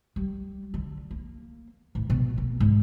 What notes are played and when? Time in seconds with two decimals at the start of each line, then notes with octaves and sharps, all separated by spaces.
0.16 G3
0.74 D3
1.11 A#3
1.95 A2
2.10 B2
2.38 A#3
2.60 G#2